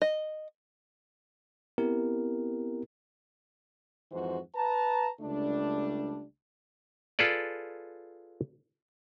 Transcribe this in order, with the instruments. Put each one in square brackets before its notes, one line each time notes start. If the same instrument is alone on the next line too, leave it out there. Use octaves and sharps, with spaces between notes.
[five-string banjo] D#5
[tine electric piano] B3 C4 E4 G4 A#4
[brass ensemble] F2 G#2 E3 F#4 C5
B4 A5 A#5
C#2 G3 A3 D4
[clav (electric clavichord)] F4 G#4 A4 B4 D5